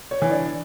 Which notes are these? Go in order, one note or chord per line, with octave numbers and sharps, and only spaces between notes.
C#5
E3
D4